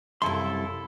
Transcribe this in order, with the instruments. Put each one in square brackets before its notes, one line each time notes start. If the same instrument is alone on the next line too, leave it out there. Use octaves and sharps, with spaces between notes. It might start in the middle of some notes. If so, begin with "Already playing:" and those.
[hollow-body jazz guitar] C2 C6 [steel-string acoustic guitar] F#2 E5 [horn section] E4 F4 A4